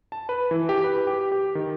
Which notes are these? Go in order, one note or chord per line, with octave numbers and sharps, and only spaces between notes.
A5
B4
E3
G4
B4
G4
G4
D#3